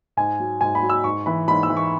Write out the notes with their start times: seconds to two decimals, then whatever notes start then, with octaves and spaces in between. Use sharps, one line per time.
0.17 G#2 G#5
0.40 F#3
0.61 G#2 G#5
0.75 B5
0.82 F#3
0.90 E6
1.04 G#2 C#6
1.26 E3 B5
1.47 G#2 B5
1.63 E6
1.70 E3
1.77 C#6